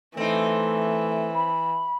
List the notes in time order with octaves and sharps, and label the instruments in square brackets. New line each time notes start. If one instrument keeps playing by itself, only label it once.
[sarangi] E3 [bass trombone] A3 [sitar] C4 D#4
[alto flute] B5